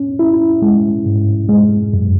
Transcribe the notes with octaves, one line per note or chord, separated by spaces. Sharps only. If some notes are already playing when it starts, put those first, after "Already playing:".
Already playing: C#4
E4
G#3
G#2
G#3
F#2